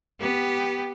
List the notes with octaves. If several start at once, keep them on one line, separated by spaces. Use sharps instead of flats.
B3 G4